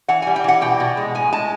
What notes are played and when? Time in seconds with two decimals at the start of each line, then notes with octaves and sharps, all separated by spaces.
0.08 E3 F#5
0.22 G#5
0.27 G3
0.36 G5
0.44 E3 F#5
0.61 B2 G5
0.80 B2
0.97 G#3
1.15 A2 G#5
1.33 G#3 A5